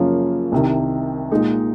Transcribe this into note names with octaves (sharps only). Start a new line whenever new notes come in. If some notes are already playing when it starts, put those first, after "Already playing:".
Already playing: F#2 C#3 F3 A#3 C#4
C2 C3 D#3
A#2 G#3 D#4